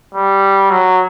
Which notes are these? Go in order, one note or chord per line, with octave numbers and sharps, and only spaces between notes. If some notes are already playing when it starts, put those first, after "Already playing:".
G3
F#3